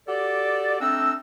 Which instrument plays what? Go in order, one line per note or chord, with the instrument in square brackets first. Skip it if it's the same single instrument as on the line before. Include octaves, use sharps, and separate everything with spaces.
[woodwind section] F#4 G4 A4 D5
A3 C4 D4 D#4 E6